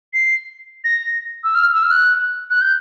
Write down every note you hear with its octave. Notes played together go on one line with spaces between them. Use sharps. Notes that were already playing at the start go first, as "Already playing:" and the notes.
C7
A#6
E6
F6
E6
F6
F#6
F#6
G6